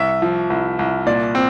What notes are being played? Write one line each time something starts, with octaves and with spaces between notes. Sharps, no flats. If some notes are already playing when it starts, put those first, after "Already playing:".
Already playing: C2 E5
F3
C2
C2
A#2 D5
C4